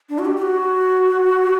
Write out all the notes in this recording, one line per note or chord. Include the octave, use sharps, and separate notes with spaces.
D4
F#4
G4
G4
F#4